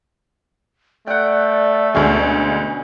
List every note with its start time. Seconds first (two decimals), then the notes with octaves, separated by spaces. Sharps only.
1.07 A3 D5 F#5 G5
1.95 D2 B2 G#3 C#4 G#4